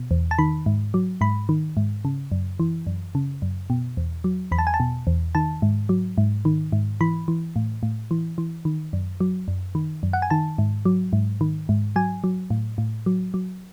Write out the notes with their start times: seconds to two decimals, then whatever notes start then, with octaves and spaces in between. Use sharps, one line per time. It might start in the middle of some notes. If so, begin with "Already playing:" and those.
Already playing: B2
0.11 E2
0.31 A5
0.39 D#3 B5
0.66 G#2
0.94 F#3
1.21 G#2 B5
1.49 D#3
1.77 G#2
2.05 C#3
2.32 F#2
2.60 E3
2.87 F#2
3.15 C#3
3.42 F#2
3.70 B2
3.97 E2
4.24 F#3
4.51 E2 B5
4.59 A5
4.67 G#5
4.74 A5
4.80 B2
5.07 E2
5.35 D#3 A5
5.62 G#2
5.89 F#3
6.18 G#2
6.45 D#3
6.72 G#2
7.01 E3 B5
7.28 E3
7.56 A2
7.83 A2
8.11 E3
8.38 E3
8.65 D#3
8.93 F#2
9.20 F#3
9.48 F#2
9.75 D#3
10.03 F#2
10.13 F#5
10.22 G#5
10.30 D#3 A5
10.58 G#2
10.85 F#3
11.13 G#2
11.41 D#3
11.69 G#2
11.96 F#3 G#5
12.24 F#3
12.50 A2
12.78 A2
13.06 F#3
13.34 F#3